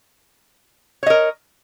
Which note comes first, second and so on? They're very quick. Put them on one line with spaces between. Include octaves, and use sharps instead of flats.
C#5 D#5 A#4